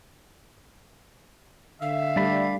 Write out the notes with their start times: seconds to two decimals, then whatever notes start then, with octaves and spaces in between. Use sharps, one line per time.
1.82 D3 E5 F5
2.16 G3 A3 D4 D5 B5